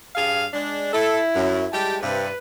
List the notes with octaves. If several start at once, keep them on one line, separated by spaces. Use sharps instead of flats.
G2 G#4 F5
G#3 D4
E4 A4
F#2
G3 G#3 G4 A5
G2 C3 B4